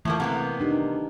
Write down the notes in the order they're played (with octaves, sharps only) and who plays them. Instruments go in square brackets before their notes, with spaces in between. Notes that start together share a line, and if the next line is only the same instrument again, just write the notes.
[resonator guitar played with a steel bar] A2 F3 A#3 [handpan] E3 A3
[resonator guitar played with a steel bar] C3 A#3 B3 [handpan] F#5
[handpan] D4 D#4 G4